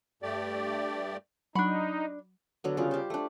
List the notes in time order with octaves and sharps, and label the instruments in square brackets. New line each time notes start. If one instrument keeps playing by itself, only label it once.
[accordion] G2 A3 G4 D5
[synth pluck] F#3 [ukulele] D4 B5 [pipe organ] D#4
[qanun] D3 F#3 B3
C#3 G3 F4
G4 C5
A3 D4